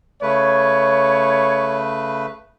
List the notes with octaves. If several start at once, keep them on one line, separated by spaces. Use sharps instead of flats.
C#3 A3 B4 C#5